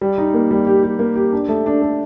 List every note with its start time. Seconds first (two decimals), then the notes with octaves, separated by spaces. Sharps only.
0.01 G3
0.18 D#4
0.34 A#3
0.51 G3
0.67 G4
0.83 G4
0.99 A#3
1.16 G4
1.33 D4
1.49 A3
1.66 D4
1.82 A4